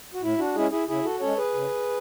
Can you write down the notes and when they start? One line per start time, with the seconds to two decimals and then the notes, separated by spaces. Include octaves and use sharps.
0.14 F#4
0.22 A2 E4
0.38 D4 F#4
0.55 G#3 C#4 E4 G#4
0.71 E4 G#4
0.88 C#3 E4 G#4
1.04 F#4 A4
1.20 G#3 C#4 A4 C#5
1.37 G#4 B4
1.54 C#3